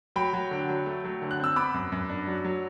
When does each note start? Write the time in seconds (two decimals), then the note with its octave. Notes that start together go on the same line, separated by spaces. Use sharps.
0.16 F#3 G5 B5
0.33 F#3
0.51 D3
0.69 F#3
0.86 A3
1.04 F#3
1.22 D3
1.31 F#6
1.40 C4 E6
1.56 B3 B5 D6
1.74 F#2
1.92 F#2
2.09 D4
2.27 F#3
2.45 F#3